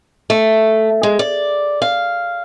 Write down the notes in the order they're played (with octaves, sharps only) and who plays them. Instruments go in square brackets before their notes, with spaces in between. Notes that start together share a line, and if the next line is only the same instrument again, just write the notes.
[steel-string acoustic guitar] A3
G#3
D5
F5